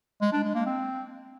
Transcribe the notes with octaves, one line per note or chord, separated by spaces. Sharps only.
G#3
D4
G#3
A#3
C4